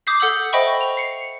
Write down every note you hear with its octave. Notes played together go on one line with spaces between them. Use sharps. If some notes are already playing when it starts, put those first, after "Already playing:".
D6 D#6 G6 B6 C7
A4 F#5 E6 G6 F#7
C5 D#5 E5 G5 B5 C#6
F7
C7 C#7